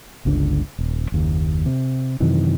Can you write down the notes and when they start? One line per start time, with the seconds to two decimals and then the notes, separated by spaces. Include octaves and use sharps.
0.25 G1 C#2 D3 D4
0.78 D#1
1.12 F#1 D#2
1.66 C3
2.20 F#2 C3 D#3 E3